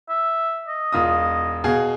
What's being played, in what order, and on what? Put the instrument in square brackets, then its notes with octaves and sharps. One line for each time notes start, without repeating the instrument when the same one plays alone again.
[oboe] E5
D#5
[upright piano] E1 F4 D#6
B2 G#4 F5